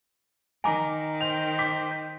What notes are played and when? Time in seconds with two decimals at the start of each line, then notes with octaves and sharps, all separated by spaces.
0.64 D#3 G#5 A#5 D6
1.21 C5 G5 F7
1.59 D6 B6